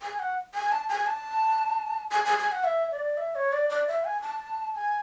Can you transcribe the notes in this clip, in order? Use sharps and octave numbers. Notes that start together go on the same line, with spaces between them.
G#5
F#5
G#5
A5
G#5
A5
G#5
G#5
G#5
F#5
E5
D5
E5
C#5
D5
D5
E5
G#5
A5
G#5